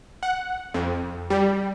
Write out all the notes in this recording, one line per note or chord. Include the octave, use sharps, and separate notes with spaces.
F#5
F2
G3